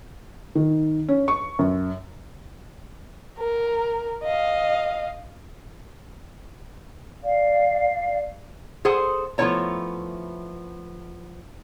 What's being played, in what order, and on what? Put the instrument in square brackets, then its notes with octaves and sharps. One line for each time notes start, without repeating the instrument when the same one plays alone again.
[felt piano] D#3
C#4
C#6
F#2
[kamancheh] A#4
D#5 F5
[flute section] D5 F5
[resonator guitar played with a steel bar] G#4 A4 C5 F#5
F3 A3 B3 E4 C#5 A#5